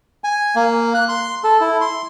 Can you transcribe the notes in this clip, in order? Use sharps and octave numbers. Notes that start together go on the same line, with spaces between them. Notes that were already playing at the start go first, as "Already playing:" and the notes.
G#5
A#3
F#6
C6
A4
E4
C6